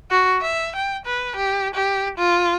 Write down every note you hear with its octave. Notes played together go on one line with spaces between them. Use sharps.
F#4
E5
G5
B4
G4
G4
F4